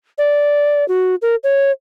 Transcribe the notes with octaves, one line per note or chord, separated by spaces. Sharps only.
D5
F#4
A#4
C#5